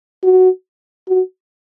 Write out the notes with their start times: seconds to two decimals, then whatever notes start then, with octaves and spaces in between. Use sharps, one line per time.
0.23 F#4
1.08 F#4